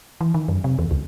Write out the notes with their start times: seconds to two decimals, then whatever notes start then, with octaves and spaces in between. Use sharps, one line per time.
0.21 E3
0.34 D#3
0.48 F#2
0.64 C3
0.79 E2
0.91 C#2